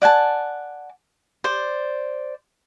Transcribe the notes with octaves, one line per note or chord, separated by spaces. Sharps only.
D5 F#5 G#5 A5
C5 D5